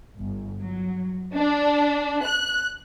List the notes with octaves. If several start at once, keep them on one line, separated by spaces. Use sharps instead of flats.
G1
F#3
D4
F#6